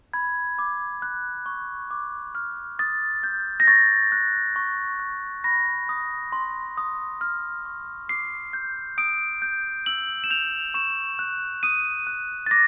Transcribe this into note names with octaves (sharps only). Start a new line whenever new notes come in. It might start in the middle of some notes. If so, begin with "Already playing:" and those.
B5 G#6
D6
F#6
C#6
D6
F6
D#6 A6
G6
A#6
C#6 A6
F#6
C#6
F#6
B5 A#6
D#6
C6
D#6
F6
C#6
D6 C7
G6
D#6 D7
G6
E6 F#7
E7
G6 F7
C#6 E7
F#6
D#6 D#7
F#6
A6
D6 A#6